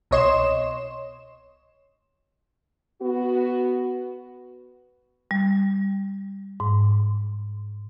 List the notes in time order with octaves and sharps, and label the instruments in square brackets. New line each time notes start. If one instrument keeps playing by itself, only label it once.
[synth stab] C2 B2 C#5 D#5 C6 E7
[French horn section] B3 F#4
[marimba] G3
G#2